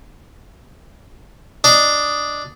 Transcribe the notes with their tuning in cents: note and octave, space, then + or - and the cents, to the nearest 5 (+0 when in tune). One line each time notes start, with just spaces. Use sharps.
D4 +0 D#5 +0